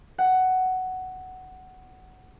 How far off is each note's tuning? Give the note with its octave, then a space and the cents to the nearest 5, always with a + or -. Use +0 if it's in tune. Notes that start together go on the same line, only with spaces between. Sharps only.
F#5 +10